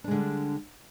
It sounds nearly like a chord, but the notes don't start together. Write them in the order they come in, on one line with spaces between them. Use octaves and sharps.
D4 G#3 D3 G3